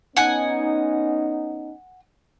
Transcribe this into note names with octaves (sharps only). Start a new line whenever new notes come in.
B3 C#4 D#4 F#5 G#5